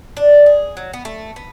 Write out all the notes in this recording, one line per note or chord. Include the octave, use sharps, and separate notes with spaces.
D4
G#4
F#3
B3
A3
B3